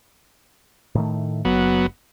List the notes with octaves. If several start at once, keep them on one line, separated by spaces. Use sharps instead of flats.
A2 D#3 A3
F#1 F#3 B3